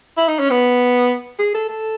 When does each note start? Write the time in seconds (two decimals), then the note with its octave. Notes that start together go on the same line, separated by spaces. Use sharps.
0.17 E4
0.28 D#4
0.39 C#4
0.50 B3
1.39 G#4
1.54 A4
1.69 A4